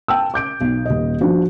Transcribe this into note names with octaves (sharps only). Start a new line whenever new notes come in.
G5 A5 E6
D6 G6 D7
B1
D#1 D#5
F3 D4 F#4